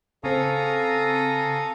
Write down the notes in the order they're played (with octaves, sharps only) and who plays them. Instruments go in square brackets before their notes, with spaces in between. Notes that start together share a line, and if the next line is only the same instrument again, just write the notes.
[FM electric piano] C#3 C4 [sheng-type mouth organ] A4 A#5 D#6 [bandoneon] F5 G#5 C#6